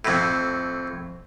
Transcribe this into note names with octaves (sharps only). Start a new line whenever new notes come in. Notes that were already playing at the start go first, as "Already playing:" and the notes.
F2 A2